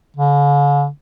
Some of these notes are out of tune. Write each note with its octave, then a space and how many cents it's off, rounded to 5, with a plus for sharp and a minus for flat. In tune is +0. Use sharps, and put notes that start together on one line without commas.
D3 -45